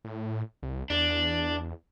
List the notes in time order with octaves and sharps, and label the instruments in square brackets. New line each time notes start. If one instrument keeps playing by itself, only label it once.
[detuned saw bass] A2
C2
[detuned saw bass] E2 [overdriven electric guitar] D4